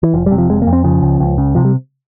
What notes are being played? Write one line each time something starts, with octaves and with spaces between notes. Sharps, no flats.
E3
F1 F3
G3
C3
F3
F1 G#3
A#3
F2
C4
C#3 F3
C#2
C#2
C#3
C3 F3
G3